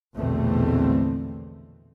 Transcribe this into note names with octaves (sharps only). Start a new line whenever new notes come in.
A#1 E2 B2 D3 A3 C4